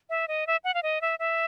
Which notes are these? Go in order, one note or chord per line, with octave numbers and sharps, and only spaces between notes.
E5
D#5
E5
F#5
F5
D#5
E5
E5